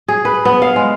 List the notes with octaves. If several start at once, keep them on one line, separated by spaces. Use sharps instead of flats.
G#4
B4
B3
F5
G#3